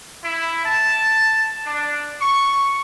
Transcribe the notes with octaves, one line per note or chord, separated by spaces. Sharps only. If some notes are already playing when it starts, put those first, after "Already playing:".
E4
A5
D4
C#6